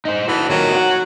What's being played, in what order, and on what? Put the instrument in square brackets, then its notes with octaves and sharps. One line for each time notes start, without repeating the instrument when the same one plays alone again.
[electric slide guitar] D#4 C5
[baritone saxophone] E3 [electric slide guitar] F#4 A4
[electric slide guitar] D#3 A#3 F4 [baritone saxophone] F#3
[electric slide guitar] F#4 D#5 F#5